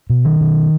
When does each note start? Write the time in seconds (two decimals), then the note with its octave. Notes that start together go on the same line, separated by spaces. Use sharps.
0.10 B2
0.25 D#3
0.41 B2